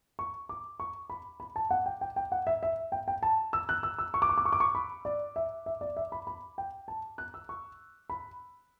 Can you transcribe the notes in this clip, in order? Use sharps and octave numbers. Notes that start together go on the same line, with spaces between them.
C#6
D6
C#6
B5
B5
A5
F#5
G5
G5
G5
F#5
E5
E5
G5
G5
A5
E6
F#6
E6
E6
C#6
D6
C#6
D6
C#6
D6
C#6
B5
D5
E5
E5
D5
E5
B5
B5
G5
A5
F#6
E6
C#6
B5